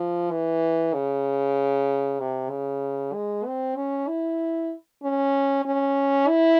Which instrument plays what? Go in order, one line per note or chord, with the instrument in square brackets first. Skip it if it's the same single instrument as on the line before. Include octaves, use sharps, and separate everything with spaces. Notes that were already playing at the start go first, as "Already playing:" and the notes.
Already playing: [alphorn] F3
E3
C#3
C3
C#3
G#3
C4
C#4
E4
C#4
C#4
E4